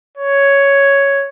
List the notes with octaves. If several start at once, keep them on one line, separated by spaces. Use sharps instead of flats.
C#5